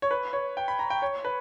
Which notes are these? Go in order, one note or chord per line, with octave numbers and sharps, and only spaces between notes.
C#5
B4
C#5
G5
B5
A#5
G5
C#5
B4